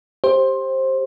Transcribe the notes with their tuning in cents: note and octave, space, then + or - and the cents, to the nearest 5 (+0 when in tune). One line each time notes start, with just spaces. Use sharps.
G4 +0 C5 +15